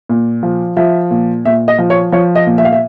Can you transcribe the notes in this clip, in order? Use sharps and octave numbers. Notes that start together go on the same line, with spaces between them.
A#2
F3
F3 E5
A#2
A#2 E5
D#5
F3
C#5
F3 C#5
D#5
A#2
E5
F5
E5